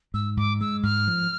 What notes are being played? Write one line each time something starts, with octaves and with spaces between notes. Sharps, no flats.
G#2 E6
G#2 D6
G#3 E6
G#2 F6
F3